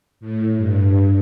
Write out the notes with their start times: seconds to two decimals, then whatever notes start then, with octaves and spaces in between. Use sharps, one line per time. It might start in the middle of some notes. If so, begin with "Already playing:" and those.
0.20 A2
0.57 G2